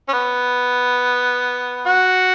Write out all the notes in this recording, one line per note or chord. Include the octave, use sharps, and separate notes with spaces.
C#4
B3
F#4